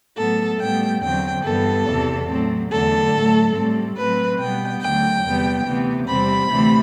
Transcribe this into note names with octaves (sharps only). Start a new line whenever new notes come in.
A2 F#3 B3 A4
A2 G3 B3 G5
E2 D3 F#3 C4 G5
G2 E3 B3 A4
E2 C3 E3
A2 F#3 C4
E2 D3 F#3 A3 A4
A2 F#3 A3
A2 G3 C4
A2 F#3 C4 B4
B2 G3 B3 G5
D2 D3 F#3 G5
E2 C3 G3 B3
D2 C3 E3 B3
E2 C3 G3 C4 B5
D2 C3 E3 A3 C4